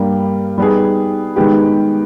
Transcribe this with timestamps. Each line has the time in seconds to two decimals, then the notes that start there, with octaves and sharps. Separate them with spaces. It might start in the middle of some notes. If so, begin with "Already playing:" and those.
Already playing: G2 G3 A#3
0.58 G3 B3 D#4 G#4
1.36 D#3 G#3 B3 G4